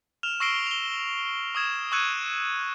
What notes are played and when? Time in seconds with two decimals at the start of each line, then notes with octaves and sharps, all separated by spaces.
0.23 F6 E7 F7
0.40 C#6 E6 A#6 C7 D7 G7
0.67 F7 G7
1.55 C#6 D#6 G#6 E7
1.92 C#6 E6 F#6 G#6 C#7 D#7